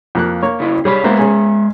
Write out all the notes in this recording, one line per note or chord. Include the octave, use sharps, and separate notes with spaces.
F2 A#3 F#6
A#3 C#5
C#3 E4
G3 G#4 C#5 B5
G#3 A#3 B3 C5 E5 A#5
C#4 G#4